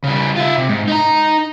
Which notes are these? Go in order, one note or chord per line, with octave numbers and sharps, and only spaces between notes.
C#3 G3
F4 E5
C3
G#2
D#4 A#5